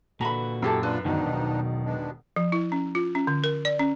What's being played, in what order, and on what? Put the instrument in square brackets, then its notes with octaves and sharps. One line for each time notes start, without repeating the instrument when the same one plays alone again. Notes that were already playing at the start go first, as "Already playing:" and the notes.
[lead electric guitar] A#2 F#4 [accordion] D3 E3 [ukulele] A#5 B5
[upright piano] F#2 [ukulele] E4 G4 A4
[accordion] D4 F4 [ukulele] B4
[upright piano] E1 B2 D#3 [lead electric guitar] F#2 D3 [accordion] F3 D4 D#4
[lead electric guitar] B1
[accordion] G#3 B3 D4
[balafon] F3
E4
C#4
F4
C#4
D3
A#4
D5
C#4